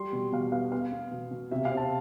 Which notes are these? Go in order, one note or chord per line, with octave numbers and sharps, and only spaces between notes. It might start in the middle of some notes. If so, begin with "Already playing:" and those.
Already playing: G3 C6
B2
B2 F5
B3 F5
B3 F5
B3
B2
B2
C3 E5
F5
C4
A5